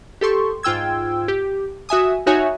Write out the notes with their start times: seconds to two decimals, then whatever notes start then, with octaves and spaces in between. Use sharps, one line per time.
0.21 G4 A4 C6 C#6
0.63 G#2 F4 G5 E6 G#6
1.28 G4
1.89 F#4 E5 G#5 D#6
2.26 D#4 F#4 C#5 E5 G#5